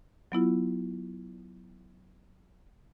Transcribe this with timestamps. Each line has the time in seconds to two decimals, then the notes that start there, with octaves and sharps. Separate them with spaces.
0.32 F#3 B3 E4 F4